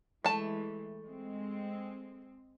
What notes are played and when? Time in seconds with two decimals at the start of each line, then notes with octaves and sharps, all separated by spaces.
0.25 E3 G#3 A3 A5
1.06 G#3 C4